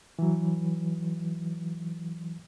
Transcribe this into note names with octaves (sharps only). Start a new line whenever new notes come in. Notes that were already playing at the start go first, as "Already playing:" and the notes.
E3 F#3